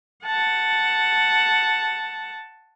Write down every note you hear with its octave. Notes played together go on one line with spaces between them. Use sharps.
F#5 A5